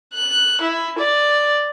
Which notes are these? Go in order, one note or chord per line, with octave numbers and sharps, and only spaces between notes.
F#6
E4
D5